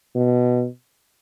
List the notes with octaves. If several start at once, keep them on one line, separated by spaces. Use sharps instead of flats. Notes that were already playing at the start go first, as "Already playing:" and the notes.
B2